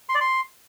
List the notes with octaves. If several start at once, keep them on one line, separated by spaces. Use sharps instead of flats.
C6
D5
C6